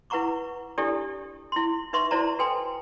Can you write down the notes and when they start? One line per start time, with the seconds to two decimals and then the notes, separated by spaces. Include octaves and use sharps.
0.10 E4 B4 F#5 A#5 C#6 D6
0.78 D4 E4 G4 A4 D5
1.52 E4 C6
1.93 D#4 B4 E5 C6 C#6
2.11 E4 F#4 C5 D5 A5 A#5
2.39 F#4 A4 B4 G5 G#5 C6